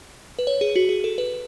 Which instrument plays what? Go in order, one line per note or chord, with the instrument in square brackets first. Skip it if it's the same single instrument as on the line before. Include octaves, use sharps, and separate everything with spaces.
[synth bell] B4
C#5
G#4
F#4
G#4
A4
B4